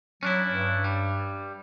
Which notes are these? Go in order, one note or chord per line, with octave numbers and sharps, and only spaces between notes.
F#3 C#4 D4 E4
G2
G3